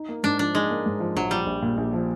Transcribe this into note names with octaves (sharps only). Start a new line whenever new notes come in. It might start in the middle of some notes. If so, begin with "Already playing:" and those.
Already playing: D#4
A#3
G#2 D4
F3 D4
G#3 D#4
A#3
G#2
F3
A#1 F#3
F3 G3
A#1
A#2
A#1
F3